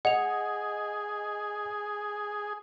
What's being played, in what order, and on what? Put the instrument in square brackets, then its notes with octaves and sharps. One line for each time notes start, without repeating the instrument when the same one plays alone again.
[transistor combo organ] G#4 [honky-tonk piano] D#5 [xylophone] F#5 F7